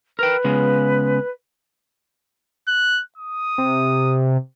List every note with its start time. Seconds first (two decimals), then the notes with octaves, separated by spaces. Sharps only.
0.19 A#4 B4 G5
0.45 C#3 G#3 B3
2.68 F#6
3.18 D#6
3.58 C3